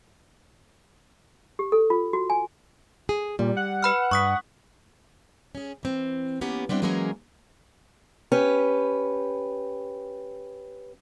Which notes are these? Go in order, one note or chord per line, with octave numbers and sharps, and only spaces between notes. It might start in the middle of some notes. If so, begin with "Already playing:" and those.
G4
A4
F4
F#4
G#5
G#4
A#2 G3
F#5
B4 B5 F6
G2 C#6 D#6 B6
C#4 G#4
E3 C4
A#3 B3 C#4 G4
G3 B3 C4 D4 E4
E3 F#3 G#3 A#3 C#4 A#4
C#4 G4 B4